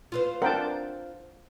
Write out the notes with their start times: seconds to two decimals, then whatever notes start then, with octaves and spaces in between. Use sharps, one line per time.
0.12 F4 B4 C5
0.42 C4 D4 A#4 F#5 G5 A5